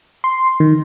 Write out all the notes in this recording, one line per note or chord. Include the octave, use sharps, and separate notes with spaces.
C6
D#3